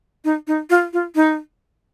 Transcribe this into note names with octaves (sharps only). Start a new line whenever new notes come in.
D#4
D#4
F4
F4
D#4